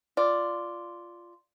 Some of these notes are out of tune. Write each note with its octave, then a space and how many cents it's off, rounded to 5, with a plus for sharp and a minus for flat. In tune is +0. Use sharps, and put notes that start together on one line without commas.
F4 -5 D5 +0